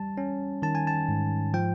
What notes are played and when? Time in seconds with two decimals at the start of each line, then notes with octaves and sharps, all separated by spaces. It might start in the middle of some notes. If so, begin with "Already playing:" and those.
Already playing: G3 A5
0.18 C#4
0.62 D#3 A5
0.75 G#5
0.87 A5
1.08 G#2
1.54 F3 G5